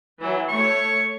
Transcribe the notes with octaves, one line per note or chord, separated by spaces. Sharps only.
E3 F#3
A3 C#5 C#6